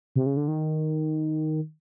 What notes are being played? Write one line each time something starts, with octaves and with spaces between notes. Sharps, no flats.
C3
C#3
D3
D#3